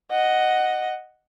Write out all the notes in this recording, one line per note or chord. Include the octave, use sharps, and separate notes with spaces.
D#5 F#5